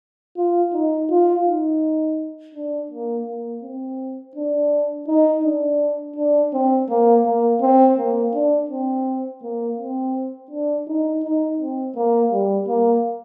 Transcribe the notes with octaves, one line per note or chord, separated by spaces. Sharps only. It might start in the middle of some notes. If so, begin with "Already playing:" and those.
F4
D#4
F4
D#4
D4
A#3
A#3
C4
D4
D#4
D4
D4
C4
A#3
A#3
C4
A#3
D4
C4
A#3
C4
D4
D#4
D#4
C4
A#3
G3
A#3